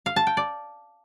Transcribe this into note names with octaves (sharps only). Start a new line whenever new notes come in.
F5
A5
G5
D5